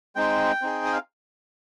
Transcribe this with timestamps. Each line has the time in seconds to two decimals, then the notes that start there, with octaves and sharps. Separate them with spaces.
0.16 G#3 C4 D#4 G5
0.62 C4 D#4 G#4
0.85 D#5
0.93 F5